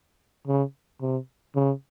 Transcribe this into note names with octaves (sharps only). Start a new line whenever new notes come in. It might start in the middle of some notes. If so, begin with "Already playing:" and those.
C#3
C3
C#3